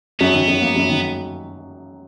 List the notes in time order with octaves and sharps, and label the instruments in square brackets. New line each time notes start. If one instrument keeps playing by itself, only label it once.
[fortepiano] F#2 [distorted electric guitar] B3
[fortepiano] D#3
F#2
A#3
F#2
D#3